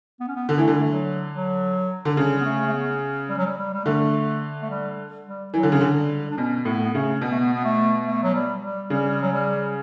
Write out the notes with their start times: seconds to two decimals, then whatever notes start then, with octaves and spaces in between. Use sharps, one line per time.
0.20 B3
0.28 C#4
0.36 B3
0.49 D3 B3
0.58 E3 A3
0.68 D3 G3
0.80 A3
0.91 F#3
1.33 F#3
2.05 D3
2.17 C#3 G3
2.40 B3
2.45 A3
2.67 A3
2.73 B3
3.29 G3
3.38 F#3
3.46 G3
3.58 G3
3.74 G3
3.85 D3 A3
4.62 A3
4.70 G3
5.26 G3
5.54 E3 F#3
5.63 D3
5.72 C#3
5.81 D3
5.96 G3
6.31 D4
6.37 B2 C#4
6.65 A2 B3
6.85 B3
6.94 C#3 A3
7.21 B2 B3
7.31 A3
7.39 B3
7.54 B3
7.64 A3
8.07 A3
8.23 F#3
8.34 G3
8.63 G3
8.90 C#3 G3
9.22 F#3
9.33 G3